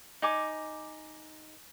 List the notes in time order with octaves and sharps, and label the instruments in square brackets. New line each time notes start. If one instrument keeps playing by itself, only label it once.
[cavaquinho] D#4 G#5 D6